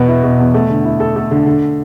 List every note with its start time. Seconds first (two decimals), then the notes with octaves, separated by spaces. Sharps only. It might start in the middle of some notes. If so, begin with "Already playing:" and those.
Already playing: E2 B2 B3
0.08 E4
0.23 B2
0.39 E2
0.54 A3
0.69 D3
0.84 E4
1.00 A4
1.16 A3
1.31 D3
1.46 D3